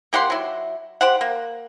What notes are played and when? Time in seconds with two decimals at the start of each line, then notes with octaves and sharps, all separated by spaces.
0.13 A#3 G4 F#5 C6
0.30 F#3 E4
1.01 G4 C5 F#5
1.21 A#3